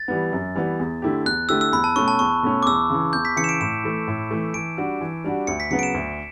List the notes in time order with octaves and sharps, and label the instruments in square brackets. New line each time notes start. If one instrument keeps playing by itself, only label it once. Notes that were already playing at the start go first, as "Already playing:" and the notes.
Already playing: [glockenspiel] A6
[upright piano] E3 G3 B3
F#2
E3 G3 B3
E2
D3 A3 E4 G4
[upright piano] E2 [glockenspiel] F#6
[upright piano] D3 A3 E4 G4 [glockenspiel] E6
[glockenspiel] E6
[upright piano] E2 [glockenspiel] B5
[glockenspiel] A5
[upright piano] B2 A3 C#4 [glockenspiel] C#6
[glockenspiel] A5
[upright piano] E2 [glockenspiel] C#6
[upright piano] B2 A3 C#4
[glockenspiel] D6
[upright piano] E2 [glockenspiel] E6
[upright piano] C#3 E3
[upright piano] E2 [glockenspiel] G6
[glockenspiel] B6
[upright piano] C#3 E3 [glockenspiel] C#7
[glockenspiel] E7
D7
[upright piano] A2 [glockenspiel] E7
[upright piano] E3 A3
A2
E3 A3
[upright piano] E3 [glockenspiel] D7
[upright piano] G3 D4 F#4
E3
G3 D4 F#4
[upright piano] D2 [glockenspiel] C#7
[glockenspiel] B6
[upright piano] C#3 F#3 B3 [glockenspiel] C#7
[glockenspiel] D7
E7
[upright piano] D2